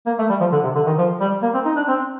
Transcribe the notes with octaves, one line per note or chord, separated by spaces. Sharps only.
A#3
A3
G3
F3
D3
C3
D3
D#3
F3
G3
A#3
C4
D#4
D4
C4